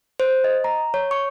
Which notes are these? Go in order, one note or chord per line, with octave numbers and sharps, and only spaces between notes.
C5
D#5
A#5
C#5
C#6